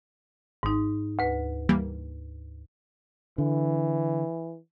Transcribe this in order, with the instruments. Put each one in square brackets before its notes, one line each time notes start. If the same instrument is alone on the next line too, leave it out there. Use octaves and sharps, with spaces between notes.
[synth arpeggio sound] G#1 [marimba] G#2 D#4
[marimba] D2 B4
[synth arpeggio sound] E3 G3 A#3
[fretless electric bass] D3 [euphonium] E3